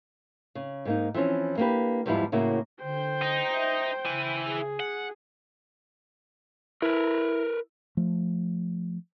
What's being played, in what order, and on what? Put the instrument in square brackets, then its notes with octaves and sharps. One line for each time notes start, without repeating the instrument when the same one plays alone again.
[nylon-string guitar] C#3
G#2 A#3 D#4
E3 F3 C4 C#4
A#3 B3 D4 G4 B4
E2 G#2 F3 G3 B3 E4
A2 C#3 A#3 E4 F#4
[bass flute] D3 [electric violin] C5 G5
[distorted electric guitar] D#4
[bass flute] E5
[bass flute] C#3 [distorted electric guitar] E4 G#5
[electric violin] G#4
[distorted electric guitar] F#5
[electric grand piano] E4 [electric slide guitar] A#4 B4
[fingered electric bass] F3 A3